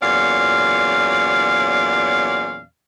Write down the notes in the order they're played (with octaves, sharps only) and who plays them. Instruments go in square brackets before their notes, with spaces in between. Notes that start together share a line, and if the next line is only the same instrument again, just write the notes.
[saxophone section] E2 A#2 F#3 C#4 D5 F5